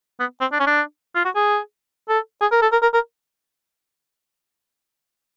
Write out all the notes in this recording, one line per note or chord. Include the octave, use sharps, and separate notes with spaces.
B3
C4
D4
C#4
D4
F4
F#4
G#4
A4
G#4
A#4
A4
A#4
A#4
A#4